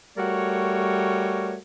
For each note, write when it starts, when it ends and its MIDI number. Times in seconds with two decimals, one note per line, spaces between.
0.18 1.56 55
0.18 1.56 57
0.18 1.56 66
0.18 1.56 70
0.18 1.56 73